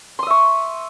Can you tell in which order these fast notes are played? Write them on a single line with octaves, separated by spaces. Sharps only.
C6 D#6 E5 C#6